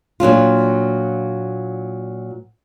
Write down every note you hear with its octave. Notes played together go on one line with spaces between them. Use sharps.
A#2 F#3 D4 F4